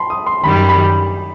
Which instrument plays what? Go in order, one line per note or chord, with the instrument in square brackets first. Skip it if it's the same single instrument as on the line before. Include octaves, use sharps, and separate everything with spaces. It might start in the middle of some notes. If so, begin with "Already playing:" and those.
Already playing: [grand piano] A5 B5 C6
D#6
C6
[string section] F#2 D#3 G3 [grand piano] B5
[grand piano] B5